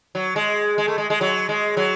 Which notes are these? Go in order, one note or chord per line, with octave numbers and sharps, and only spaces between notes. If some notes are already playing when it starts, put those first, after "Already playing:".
F#3
G#3
G#3
A3
G#3
G#3
F#3
G#3
F#3